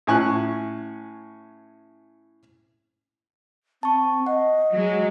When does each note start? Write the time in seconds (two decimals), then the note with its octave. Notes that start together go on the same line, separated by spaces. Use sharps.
0.07 A2 C#4 G#5 C#6 F#6
3.83 C4 A5 C#6
4.26 D#5 F#5
4.73 F#3 G#3